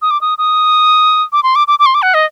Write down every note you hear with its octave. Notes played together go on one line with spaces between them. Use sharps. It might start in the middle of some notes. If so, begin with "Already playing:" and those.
D#6
D6
D#6
D#6
D6
C6
D6
D6
D6
C6
D6
F#5
D#5